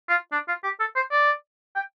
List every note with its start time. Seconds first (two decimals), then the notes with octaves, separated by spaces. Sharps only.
0.09 F4
0.32 D4
0.48 F4
0.64 G4
0.80 A4
0.96 C5
1.12 D5
1.76 G5